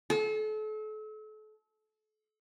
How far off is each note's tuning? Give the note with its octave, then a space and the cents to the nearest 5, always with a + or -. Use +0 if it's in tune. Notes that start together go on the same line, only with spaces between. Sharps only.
A4 -35